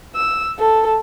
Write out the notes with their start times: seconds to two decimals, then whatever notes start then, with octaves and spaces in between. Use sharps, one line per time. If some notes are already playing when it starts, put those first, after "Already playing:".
0.15 E6
0.59 A4